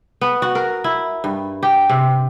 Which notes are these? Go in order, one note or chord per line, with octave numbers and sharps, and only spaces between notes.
B3
F#4
A#4
E4
G2
G4
C3